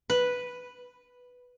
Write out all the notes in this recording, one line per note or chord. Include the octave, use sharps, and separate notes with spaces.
B4